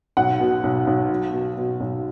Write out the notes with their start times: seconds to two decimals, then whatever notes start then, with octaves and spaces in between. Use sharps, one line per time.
0.17 B1 F#5
0.40 B2
0.64 B1
0.87 B1
1.10 F#3
1.33 B2
1.57 B2
1.80 B1